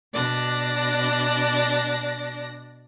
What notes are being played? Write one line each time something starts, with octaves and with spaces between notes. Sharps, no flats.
B2 D4 D5 A#6